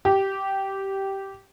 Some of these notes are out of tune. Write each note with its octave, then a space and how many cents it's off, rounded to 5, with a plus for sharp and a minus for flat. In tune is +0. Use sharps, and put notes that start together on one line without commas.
G4 -10